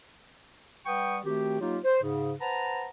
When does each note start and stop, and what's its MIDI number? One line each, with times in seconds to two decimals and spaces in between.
0.86 1.19 55
0.86 1.19 71
0.86 1.19 78
0.86 1.19 79
0.86 1.19 85
0.86 1.19 87
1.24 1.60 51
1.24 1.60 57
1.24 1.60 60
1.24 1.60 66
1.24 1.60 67
1.61 1.78 54
1.61 1.78 58
1.61 1.78 63
1.61 1.78 65
1.61 1.78 67
1.85 2.03 72
2.03 2.32 44
2.03 2.32 49
2.41 2.88 71
2.41 2.88 72
2.41 2.88 78
2.41 2.88 81
2.41 2.88 82